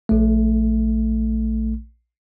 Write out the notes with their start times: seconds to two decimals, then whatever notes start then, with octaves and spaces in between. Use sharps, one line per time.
0.09 A#1 A3